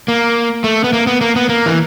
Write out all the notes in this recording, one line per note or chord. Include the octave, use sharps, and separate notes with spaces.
A#3
A3
B3
A#3
B3
A#3
B3
A#3
E3